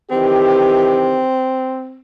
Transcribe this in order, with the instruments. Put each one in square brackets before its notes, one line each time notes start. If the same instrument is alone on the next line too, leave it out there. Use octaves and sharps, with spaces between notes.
[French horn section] D#3 E3 G4 [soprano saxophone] C4